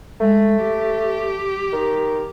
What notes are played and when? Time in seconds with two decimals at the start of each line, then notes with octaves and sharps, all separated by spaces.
0.20 G#3 A3
0.61 G4
1.73 D#3